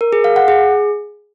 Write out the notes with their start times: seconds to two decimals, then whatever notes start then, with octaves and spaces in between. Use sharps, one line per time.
0.01 A#4
0.13 G#4
0.24 F5
0.36 F#5
0.48 G#4